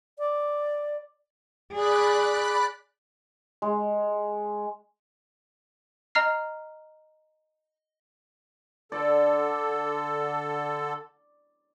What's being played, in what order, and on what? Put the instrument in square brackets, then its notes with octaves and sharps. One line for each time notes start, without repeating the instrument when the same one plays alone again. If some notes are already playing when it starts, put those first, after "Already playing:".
[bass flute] D5
[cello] G#4 [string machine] D5 B5 F#6
[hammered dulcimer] G#3
[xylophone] D#5 A#5 F6 C7
[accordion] D3 A4 [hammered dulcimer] D5